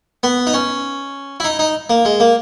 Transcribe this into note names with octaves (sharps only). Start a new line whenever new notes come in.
B3
D#4
C#4
E4
D#4
D#4
A#3
G#3
A#3